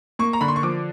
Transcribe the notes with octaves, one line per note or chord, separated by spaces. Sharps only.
A#3 C#6
A#5
D3 B5
C6
C#6
F3 D6